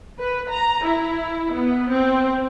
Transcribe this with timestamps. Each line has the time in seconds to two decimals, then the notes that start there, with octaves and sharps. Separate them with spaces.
0.19 B4
0.49 A#5
0.84 E4
1.53 B3
1.91 C4